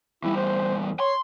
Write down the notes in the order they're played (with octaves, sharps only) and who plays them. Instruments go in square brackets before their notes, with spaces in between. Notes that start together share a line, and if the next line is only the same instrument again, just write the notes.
[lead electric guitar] E2 G3 [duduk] E4
[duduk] C5
[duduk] C#5 [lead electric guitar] C6